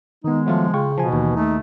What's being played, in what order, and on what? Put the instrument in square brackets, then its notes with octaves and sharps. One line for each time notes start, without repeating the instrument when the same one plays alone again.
[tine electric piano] D#3 B3 [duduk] G#3 [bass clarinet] D#4
[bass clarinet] F3 [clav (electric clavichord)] F#3 A3 F4
[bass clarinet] C#3 [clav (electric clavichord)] F4 [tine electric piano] G5 C#6
[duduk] B2 [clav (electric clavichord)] F3 [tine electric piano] G#5 A5
[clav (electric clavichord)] D#2 [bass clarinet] E3
[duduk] A3 [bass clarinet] D#4